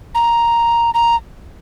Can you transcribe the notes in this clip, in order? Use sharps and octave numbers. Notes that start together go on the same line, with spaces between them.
A#5
A#5